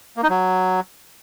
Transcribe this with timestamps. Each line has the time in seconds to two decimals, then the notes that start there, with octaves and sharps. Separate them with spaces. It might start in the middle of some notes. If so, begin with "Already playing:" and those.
0.17 A#3
0.23 D#4
0.30 F#3